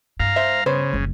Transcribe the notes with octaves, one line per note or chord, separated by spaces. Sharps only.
G2 F5 A#5
C5 E5
C#3 B3 C5 C#5
F#1 G3